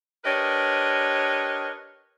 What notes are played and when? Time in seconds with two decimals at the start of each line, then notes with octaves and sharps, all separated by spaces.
0.25 D4 G4 A#4 B4 C#5 D#5